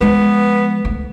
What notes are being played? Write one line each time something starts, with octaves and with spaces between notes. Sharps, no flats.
F3 G#3 B3
D2